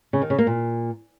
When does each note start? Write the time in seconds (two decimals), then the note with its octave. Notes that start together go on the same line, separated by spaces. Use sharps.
0.13 C#3
0.22 D#3
0.30 C#3
0.38 A#3
0.47 A#2